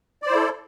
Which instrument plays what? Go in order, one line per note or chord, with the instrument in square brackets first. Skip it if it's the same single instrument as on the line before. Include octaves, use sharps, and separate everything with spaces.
[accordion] D5
C5
E4
A4